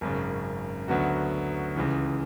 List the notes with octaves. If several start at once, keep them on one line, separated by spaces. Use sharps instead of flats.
G#1 F#2 C#3
D2 D3 F#3 B3 F#4
C#2 C#3 E3